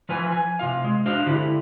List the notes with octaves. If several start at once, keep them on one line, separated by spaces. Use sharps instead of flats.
F3 F4 B4 G#5
G#5
C3 F4 F5
G#3
D4 F#4 C5 F5
D3 E4 G4